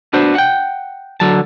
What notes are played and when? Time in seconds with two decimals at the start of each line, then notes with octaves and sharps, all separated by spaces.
0.13 B3 D4 F#4 C5
0.35 F#5 G5
1.20 D3 F#3 A5